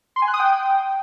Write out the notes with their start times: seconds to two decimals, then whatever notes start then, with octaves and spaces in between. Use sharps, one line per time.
0.16 C6
0.22 G#5
0.28 F#6
0.34 D#6
0.39 G5